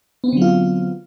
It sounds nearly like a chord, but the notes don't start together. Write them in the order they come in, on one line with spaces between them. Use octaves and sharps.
B3 C4 D3 F#3 F4